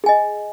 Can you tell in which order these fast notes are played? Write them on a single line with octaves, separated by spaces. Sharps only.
G#4 G#5 D#5